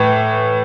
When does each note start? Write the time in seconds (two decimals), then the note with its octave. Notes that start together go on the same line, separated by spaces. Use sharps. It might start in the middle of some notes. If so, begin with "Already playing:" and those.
Already playing: A2 E3